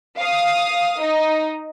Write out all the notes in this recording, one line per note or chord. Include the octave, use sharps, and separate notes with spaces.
F5 D#6
D#4